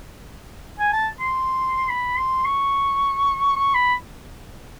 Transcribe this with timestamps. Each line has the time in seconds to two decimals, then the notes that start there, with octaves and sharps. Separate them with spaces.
0.79 G#5
0.93 A5
1.20 C6
1.90 B5
2.18 C6
2.45 C#6
3.56 C#6
3.74 B5